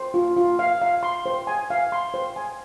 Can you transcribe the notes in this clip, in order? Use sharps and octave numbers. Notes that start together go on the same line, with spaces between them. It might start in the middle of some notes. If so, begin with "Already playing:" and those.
Already playing: C5
F4
F4
F5
F5
C6
C5
G#5
F5
C6
C5
G#5